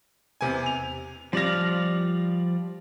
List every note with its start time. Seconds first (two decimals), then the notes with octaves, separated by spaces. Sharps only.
0.41 E2 C3 G#5
0.66 F7
1.33 F3 G3 D5 F5 A#6